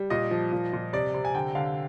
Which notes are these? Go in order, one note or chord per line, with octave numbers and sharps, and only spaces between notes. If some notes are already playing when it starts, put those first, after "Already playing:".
Already playing: G3
A#2 D#5
F3
A#2
A#2
C3 D5
C3
G#5
D3 G5
D3 F5